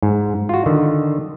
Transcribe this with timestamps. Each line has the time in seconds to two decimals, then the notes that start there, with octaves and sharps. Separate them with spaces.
0.03 G#2
0.49 F4 F#4
0.66 D3 D#3